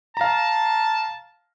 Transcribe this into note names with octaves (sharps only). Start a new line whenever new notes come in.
F5 A5 A#5